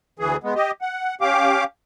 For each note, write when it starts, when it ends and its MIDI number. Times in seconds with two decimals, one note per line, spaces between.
0.19 0.36 38
0.19 0.36 52
0.19 0.36 68
0.44 0.54 56
0.44 0.54 59
0.56 0.71 67
0.56 0.71 75
0.81 1.15 78
1.21 1.64 61
1.21 1.64 67
1.21 1.64 77
1.21 1.64 86